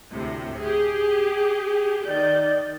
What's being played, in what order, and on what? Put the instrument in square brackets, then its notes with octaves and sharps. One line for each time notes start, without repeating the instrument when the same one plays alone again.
[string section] D2 A2 C3
G4 G#4
[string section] D#3 G6 [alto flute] D5